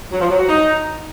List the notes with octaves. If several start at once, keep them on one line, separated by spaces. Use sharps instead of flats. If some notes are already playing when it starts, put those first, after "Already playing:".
F#3
F3
F#3
F#4
D#4